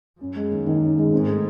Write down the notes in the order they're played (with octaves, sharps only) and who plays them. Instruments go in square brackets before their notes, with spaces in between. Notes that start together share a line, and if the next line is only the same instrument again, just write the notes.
[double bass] F#2 [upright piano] C#4
[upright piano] G#3
D#2
D#3
C#4
G#3
[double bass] G#2 [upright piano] C4
[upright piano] A3